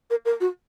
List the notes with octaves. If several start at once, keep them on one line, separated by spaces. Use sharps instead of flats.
A#4
A#4
F#4